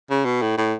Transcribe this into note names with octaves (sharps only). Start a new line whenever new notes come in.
C#3
B2
A2
A2